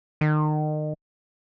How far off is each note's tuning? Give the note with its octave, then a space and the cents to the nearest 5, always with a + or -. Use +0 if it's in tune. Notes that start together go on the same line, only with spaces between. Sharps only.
D#3 -30